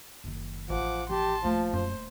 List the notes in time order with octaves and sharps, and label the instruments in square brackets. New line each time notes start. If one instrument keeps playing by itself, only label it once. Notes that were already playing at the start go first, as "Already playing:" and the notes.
[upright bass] F#1 D#3
[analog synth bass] A1 [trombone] F3 [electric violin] F#5 D6
[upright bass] F3 D#4 [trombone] G4 [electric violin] A5 C6
[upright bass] D#1 A3 [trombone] F3
[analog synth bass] F#2 [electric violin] C5